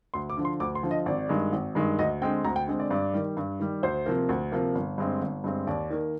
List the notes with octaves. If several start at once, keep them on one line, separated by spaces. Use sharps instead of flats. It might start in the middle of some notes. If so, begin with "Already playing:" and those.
D2 C6
D6
D3 F3
C6
D2 D6
C6
D3 F3
D#5
G#1 D5
G2 D#3 G#3
G#1
G2 D#3 G#3
D2 D#5
D3 G#3 C4 G5
D2 A#5
G5
D3 G#3 C4
D5
G2 D5
D#3 G3
G2
D#3 G3
D2 C5
C3 F3 A#3
D2
C3 F3 A#3
G1
G2 D3 G#3 C4
G1
G2 D3 G#3 C4
D#2 D5
D#3 A#3